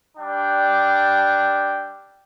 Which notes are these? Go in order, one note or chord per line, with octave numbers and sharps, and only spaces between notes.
G3 D4 G5